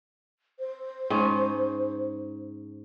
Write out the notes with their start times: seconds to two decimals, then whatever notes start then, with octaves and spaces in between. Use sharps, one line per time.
0.60 C5
1.10 G#2 C#4